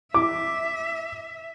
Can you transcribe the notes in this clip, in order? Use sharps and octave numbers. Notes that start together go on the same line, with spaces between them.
E5 D6